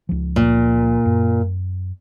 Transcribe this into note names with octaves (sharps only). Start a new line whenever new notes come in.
C#2 F3
A#2
F#2